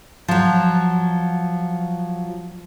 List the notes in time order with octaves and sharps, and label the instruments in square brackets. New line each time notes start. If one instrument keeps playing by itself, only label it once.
[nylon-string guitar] F3 F#3